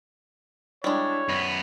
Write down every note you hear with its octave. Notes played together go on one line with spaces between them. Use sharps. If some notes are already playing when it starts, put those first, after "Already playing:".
G3 G#3 D4 E4 C#5
F#2 B3 B5